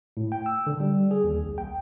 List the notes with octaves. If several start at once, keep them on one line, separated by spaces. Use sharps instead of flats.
A2
G5
E6
D3
G3
G#4
D#2
C2
G5